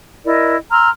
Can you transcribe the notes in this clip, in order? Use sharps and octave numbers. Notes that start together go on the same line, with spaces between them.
E4 A#4 D5 D#5
A#5 C6 E6 F6